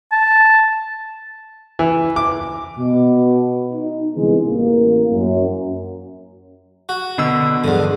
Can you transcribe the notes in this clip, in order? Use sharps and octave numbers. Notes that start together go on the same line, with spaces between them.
A5
E3
D6
B2
D#4
C2 D3 E3 G#3 B3
A1 A#3
F#2
F#4
B2 D3 E6
E2 G2 D3